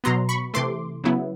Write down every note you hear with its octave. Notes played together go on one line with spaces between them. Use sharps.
B2 F#3 B3 A#5 C6
B5 C#6
C3 E3 A3 C6 D6
C#3 F#3 B3 E4